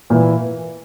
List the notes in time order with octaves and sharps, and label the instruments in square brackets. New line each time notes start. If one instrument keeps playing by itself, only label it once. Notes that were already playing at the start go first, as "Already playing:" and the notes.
[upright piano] A#2 [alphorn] E3